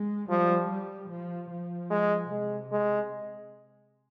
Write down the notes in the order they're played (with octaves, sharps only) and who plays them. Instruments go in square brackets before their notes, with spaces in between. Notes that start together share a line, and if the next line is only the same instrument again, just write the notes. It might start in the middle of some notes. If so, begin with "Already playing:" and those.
Already playing: [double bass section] G#3
[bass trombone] F3 [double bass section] G3
[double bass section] G3
F3
F3
[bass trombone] G#3
[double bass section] C3 [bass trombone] G#3
[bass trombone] G#3